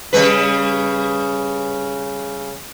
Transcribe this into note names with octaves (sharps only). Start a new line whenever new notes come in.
C#3 G3 B4